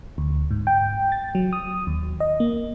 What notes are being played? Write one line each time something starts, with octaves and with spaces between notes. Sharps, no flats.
D2
G#2
G5
A6
F#3
D#6
D#2
D#5
A#3